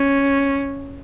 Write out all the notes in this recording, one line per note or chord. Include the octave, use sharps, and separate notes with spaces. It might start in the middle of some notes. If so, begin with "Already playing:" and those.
Already playing: C#4